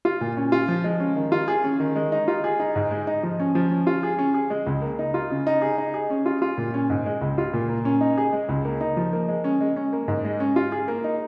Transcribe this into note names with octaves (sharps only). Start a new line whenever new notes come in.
F4
A#2
C#4
F4
F3
G#3
C#4
D#3
F4
G#4
C#4
D#3
G#3
D#4
F4
G#4
D#4
G#2
G#3
D#4
F3
C#4
F3
C#4
F4
G#4
C#4
G#4
G#3
C#2
A#3
D#4
F4
C#3
D#4
G#4
D#4
G#4
C#4
F4
F4
A#2
C#4
G#2
G#3
C#2
F4
A#2
A#3
C#4
D#4
G#4
G#3
C#2
A#3
D#4
F3
A#3
G#3
C#4
G#3
C#4
A#3
G#2
G#3
C#4
F4
G#4
A#3
D#4